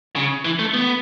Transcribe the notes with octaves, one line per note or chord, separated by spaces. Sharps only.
C#3
E3
A3
B3